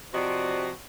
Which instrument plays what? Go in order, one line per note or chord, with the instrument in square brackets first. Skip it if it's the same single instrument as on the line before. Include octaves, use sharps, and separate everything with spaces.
[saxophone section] C3 F3 F#4 D5 D#5